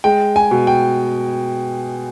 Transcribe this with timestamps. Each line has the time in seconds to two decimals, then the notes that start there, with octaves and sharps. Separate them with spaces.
0.04 G#3 G5
0.36 G#5
0.51 B2
0.67 G5